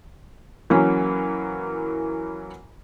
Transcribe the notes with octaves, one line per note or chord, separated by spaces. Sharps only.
E3 F#3 A#3 C#4